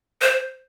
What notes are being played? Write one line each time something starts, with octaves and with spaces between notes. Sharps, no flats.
C5